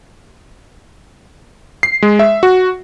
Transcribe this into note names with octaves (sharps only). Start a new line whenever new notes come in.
C7
G#3
E5
F#4